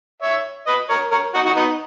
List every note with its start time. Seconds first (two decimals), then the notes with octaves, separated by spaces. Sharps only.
0.22 C#5 E5
0.67 B4 D#5
0.90 A#4 C#5
1.11 A#4 C#5
1.34 D#4 F#4
1.46 D#4 F#4
1.57 B3 D#4